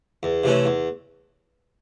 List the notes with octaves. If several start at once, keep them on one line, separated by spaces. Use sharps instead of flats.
E2
C3 E3 A3 C#4
E2